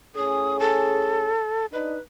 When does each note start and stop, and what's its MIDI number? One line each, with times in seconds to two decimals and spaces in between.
0.16 1.33 45
0.16 1.33 61
0.16 1.33 68
0.16 0.57 87
0.59 1.66 69
1.73 1.95 62
1.73 1.95 63
1.73 2.00 71